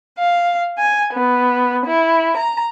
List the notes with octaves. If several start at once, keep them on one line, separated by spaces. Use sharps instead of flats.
F5
G#5
B3
E4
A#5